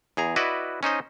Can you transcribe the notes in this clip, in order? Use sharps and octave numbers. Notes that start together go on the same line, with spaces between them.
E2 G#4 A#5
E4 F#4 B4 D5 D#5
C#4 D#4 C5 D#5